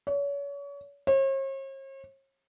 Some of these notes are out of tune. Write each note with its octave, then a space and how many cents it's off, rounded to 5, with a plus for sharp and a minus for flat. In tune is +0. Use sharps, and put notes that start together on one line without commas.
C#5 +35
C#5 -45